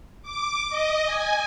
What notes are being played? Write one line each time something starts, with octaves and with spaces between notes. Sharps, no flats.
D6
D#5
G#5